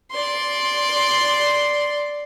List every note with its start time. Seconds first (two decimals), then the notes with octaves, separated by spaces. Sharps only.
0.12 D5 C6